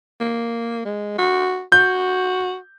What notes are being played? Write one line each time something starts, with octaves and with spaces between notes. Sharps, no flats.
A#3
G#3
F#4
F#4 G6